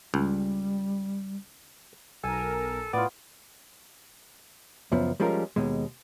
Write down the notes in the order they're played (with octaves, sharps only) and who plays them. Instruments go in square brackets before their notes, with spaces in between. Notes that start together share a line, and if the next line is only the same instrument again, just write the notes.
[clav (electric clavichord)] C#2 [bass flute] G3
[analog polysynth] B1 A#4 [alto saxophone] A4 [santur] G#5
[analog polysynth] A2 [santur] B3 F4 [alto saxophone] D5
[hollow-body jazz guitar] C#2 F#2 F3 B3
F3 G3 G#3 C#4 F4 A#4
D#2 B2 G#3